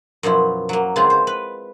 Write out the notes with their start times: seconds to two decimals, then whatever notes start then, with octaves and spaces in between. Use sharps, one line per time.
0.23 F#2 B2 F3 E4
0.69 F#3 A#3
0.96 C#3 G#3 B3 C4 E4 F4
1.10 C5
1.27 B4